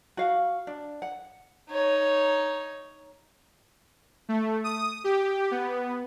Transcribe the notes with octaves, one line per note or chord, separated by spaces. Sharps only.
F#4 F5
D4
F#5
D#4 C#5
A3
D#6
G4
B3